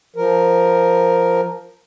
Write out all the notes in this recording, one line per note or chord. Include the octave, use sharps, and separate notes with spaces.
F3 A#4